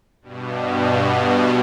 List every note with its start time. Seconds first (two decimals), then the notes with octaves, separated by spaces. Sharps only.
0.22 G2 B2